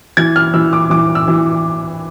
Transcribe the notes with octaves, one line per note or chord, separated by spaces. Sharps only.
E3 G#6
F6
E3 E6
D6
E3 D6
E6
E3